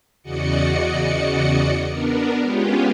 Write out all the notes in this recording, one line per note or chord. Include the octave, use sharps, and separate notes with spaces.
E2 C#3 F#4 D5 D#5 C#7
B3 D4 A#4
G#3 B3 C#4 F4 G4